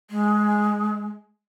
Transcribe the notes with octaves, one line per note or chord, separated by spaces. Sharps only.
G#3